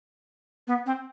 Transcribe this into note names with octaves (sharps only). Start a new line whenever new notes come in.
B3
C4